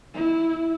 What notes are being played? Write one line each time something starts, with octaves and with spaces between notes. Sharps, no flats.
E4